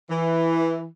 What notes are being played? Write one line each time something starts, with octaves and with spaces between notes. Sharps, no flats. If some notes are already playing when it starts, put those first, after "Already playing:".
E3